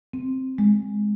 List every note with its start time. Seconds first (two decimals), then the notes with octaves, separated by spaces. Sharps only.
0.13 C4
0.58 G#3